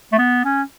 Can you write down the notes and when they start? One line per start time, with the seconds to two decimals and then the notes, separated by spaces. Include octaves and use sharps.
0.12 A3
0.18 B3
0.45 C#4